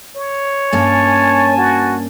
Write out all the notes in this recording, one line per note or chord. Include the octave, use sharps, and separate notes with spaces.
C#5
G2 A#3 C#4 G#5 A5
F#4